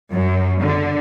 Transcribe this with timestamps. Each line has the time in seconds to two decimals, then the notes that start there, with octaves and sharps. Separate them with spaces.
0.13 F#2
0.61 D3